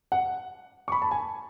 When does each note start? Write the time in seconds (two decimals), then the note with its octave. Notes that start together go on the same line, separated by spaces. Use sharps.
0.12 F#5
0.88 C#6
0.92 B5
1.02 A5
1.11 G#5